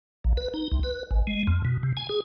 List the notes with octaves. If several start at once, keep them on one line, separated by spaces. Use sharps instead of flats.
A#1
B4
D#4
C2
B4
G#1
G#3
F2
B2
C3
G#5
G#4